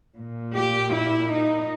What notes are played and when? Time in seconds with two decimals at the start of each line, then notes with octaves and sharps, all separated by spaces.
0.18 A#2
0.56 G4
0.93 E4
1.32 D#4